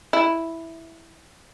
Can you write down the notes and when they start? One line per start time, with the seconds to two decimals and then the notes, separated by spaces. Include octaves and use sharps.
0.13 E4